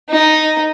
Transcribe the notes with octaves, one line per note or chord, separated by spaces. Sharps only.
D#4